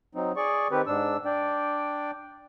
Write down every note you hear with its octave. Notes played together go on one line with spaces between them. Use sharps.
F#3 C4 D#4
G#4 D5 C#6
D#3 C4 G4 B4
G#2 D4 E6
D4 D5 G5